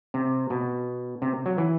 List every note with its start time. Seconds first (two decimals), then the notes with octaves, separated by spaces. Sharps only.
0.14 C3
0.50 B2
1.22 C3
1.46 F#3
1.58 E3